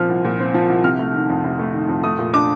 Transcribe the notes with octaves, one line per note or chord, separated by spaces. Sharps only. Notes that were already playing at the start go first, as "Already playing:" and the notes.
Already playing: A#2 F3 C4 F6
C2
A#2
C4
F3
C2
C3 F6
A3
D#3
F2
C3
A3
D#3
F2
A3 D#6
A#2
D4 D6